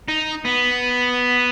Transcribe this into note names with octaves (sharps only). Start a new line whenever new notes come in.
D#4
B3